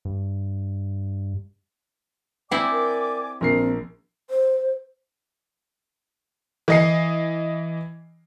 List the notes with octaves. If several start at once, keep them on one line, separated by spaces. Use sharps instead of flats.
G2
C4 E4 D5 G5 G#5 D6
A#4
A#1 C4 A#4 C7
C5
E3 D#5 C7